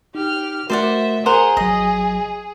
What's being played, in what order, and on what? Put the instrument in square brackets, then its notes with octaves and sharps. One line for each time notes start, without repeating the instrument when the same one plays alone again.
[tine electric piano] D#4 [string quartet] G4 F6
[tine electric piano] A3 F#4 A#4 [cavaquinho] C5 D5 F#5 [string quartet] E5
[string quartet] G#4 [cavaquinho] A#4 C5 F#5 [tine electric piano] C6
[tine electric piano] G#1 F#3 [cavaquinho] D#5